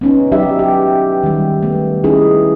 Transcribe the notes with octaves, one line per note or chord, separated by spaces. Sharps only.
B3 C#4 D#4
F#3 D#4 G4 D5 E5
G4
D#3 G3
A3 B3
C#4 D#4 E4 G#4